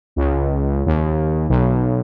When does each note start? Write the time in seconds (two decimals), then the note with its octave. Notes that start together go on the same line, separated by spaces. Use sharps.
0.16 C#2
0.86 D#2
1.49 B1